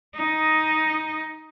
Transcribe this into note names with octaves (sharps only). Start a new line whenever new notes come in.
D#4 D#5